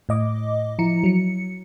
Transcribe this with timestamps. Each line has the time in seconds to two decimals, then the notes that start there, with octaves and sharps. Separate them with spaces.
0.09 A2 D#5 D6
0.79 F3 E4 A#5 C#7
1.04 F#3 C#7